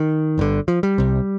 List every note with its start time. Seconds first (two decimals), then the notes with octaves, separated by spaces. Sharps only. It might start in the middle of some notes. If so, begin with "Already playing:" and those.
Already playing: D#3
0.38 G1 G2 D3
0.68 F3
0.83 G3
0.98 C2 C3